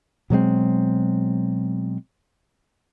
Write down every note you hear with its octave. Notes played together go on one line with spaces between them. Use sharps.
B2 F#3 G#3 C4